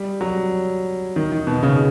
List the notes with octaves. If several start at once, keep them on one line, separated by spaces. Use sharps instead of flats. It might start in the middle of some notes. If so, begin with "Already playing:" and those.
Already playing: G3
F#3
D#3
D#3
B2
C#3